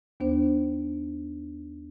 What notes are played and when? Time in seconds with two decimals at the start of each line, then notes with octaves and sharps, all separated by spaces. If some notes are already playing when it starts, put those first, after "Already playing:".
0.20 D#2 B3 D4 C5